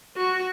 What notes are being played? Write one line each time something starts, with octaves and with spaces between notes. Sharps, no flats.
F#4